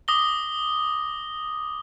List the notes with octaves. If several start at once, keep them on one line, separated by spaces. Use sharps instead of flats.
D6 D#6 A#6 G7